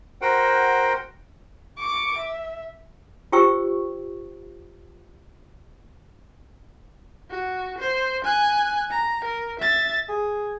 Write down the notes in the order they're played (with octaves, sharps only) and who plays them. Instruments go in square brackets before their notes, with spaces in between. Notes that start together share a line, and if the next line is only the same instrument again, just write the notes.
[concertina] F#4 A#4 C5 F#5 G5
[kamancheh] C#6 D6
E5
[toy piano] F4 G4 C5 G5 C#6 E6
[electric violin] F#4
C5
G#5 F#6
A#5
A#4
E5 A6
[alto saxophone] G#4